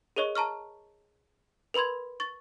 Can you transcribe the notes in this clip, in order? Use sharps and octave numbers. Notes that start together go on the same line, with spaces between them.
G#4 A#4 C#5 D#5 C#6
A5 A#5 C#6 F6
A#4 B4 B5 C6 G#6
C#6 A6